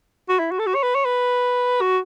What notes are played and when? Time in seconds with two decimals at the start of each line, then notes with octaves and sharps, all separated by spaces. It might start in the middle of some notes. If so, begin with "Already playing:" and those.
0.29 F#4
0.39 E4
0.51 F#4
0.59 A4
0.66 F#4
0.75 C#5
0.83 B4
0.95 C#5
1.05 B4
1.81 F#4